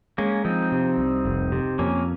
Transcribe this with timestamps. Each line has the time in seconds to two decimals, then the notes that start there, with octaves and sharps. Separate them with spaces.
0.18 G#3 A#3 C#4
0.45 F3 C4 D#4
0.72 C3
0.98 C2
1.25 F1
1.52 C3
1.79 F2 A#3 C#4